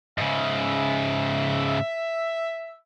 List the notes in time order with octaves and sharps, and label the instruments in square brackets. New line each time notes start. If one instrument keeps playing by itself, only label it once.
[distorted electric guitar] G#2 C#3 [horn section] E5